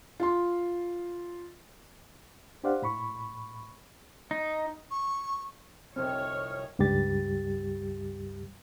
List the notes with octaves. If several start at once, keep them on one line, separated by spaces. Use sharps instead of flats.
F4 C6
D4 G4 C5 D5 F5 F#5
A2 B5 C#6
D#4
C#6
F1 C2 C4 C#5 D#5 F6
C#2 G2 G3 G4 A6